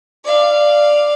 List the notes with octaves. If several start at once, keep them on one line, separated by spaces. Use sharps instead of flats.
D5 F5